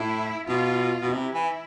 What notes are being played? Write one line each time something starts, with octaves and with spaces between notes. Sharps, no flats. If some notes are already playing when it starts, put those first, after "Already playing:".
Already playing: A2 E4
B2 F4
B2
C3 E4
E3